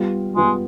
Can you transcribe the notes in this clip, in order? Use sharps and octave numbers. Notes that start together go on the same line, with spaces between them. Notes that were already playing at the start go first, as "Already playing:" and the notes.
Already playing: G3 B3 F4
G3 G#3 B3 F4